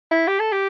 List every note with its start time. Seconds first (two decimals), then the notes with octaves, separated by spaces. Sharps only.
0.11 E4
0.28 G4
0.40 A4
0.52 G4